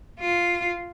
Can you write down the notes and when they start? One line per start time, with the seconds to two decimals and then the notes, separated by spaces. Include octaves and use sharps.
0.20 F4